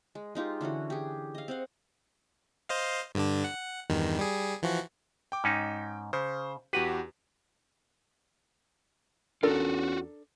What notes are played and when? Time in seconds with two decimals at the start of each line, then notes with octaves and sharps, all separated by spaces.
0.15 G#3
0.35 G#3 D#4 F4 G4
0.61 D3 E3 C#4 F#4
0.90 G4 G#4
1.35 D#5 F5
1.48 C4 F5 F#5
2.69 C5 D#5 F5
3.15 G2 D3 D4
3.44 F#5
3.90 E2 G2 D#3
4.19 G3 G#4
4.62 E3 F3 F#4
5.32 G5 D6
5.44 G#2 C#4 D#4
6.13 C#3 C5
6.73 E2 F#4 G4 B4
9.43 E2 C#4 D4 F4 F#4 A4 A#4